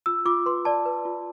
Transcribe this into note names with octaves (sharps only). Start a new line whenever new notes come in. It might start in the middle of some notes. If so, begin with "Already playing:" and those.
F4 E6
F4 D6
B4 C6
D5 A5
B4
F4